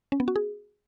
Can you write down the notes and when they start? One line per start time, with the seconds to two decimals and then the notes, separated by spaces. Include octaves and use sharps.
0.12 C#4
0.20 B3
0.28 F#4
0.36 G#4